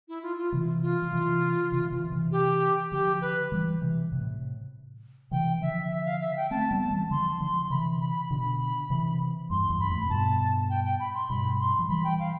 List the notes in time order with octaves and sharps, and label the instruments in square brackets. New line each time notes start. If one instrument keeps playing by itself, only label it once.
[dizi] E4
F4
F4
[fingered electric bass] C3 E3
[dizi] F4
[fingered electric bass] F3
C3 E3
C3 E3
C3 E3
C3 E3
[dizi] G4
[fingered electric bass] D3 F3 [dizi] G4
[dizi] B4
[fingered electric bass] E3 G3
C3 E3
A2 C3
[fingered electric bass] C3 E3 [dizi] G5
[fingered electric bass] D3 F3 [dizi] E5
[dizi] E5
F5
E5
G5
[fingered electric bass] A3 C4 [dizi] A5
[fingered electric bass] G3 B3
[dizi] A5
[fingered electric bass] E3 G3
[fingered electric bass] D3 F3 [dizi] C6
[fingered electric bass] D3 F3 [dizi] C6
[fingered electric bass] C3 E3 [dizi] B5
[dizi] B5
[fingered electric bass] B2 D3 [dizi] B5
[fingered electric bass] C3 E3
[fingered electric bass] E2 G2 [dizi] C6
[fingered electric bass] E2 G2
[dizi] B5
[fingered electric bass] F2 A2
C3
[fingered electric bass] G2 B2 [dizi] A5
[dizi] G5
G5
B5
C6
[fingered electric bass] G2 B2 [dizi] B5
[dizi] C6
[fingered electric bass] F3
[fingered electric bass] E3 G3 [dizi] B5
[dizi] G5
F5